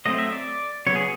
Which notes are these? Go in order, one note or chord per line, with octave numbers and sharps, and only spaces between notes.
F#3 A3 C4 D#5
E5
D5
C#3 F#3 B3 C#5
G#4